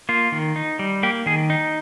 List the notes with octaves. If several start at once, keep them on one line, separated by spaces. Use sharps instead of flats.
A#3 F4
D#3
D#4
G3
A#3 G4
D#3 G#4
D#4